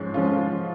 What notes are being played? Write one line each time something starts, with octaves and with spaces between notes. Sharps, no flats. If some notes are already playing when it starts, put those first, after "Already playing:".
Already playing: G#2 F3 G#3 C#4
F3 G#3 C#4 F4